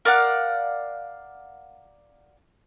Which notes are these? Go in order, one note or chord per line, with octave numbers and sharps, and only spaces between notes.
A#4 D5 F5 F#5